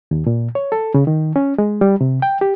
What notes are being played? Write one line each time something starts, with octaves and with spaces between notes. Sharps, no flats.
D#2
A#2
C#5
A4
C#3
D#3
C#4
G#3
G3
C3
G5
G4